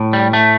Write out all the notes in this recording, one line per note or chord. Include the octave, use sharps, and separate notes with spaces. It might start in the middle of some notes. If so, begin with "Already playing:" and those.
Already playing: A2
G3
A3